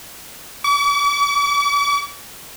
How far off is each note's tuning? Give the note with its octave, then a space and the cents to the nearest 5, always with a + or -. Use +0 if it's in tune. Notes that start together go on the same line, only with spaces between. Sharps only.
D6 -45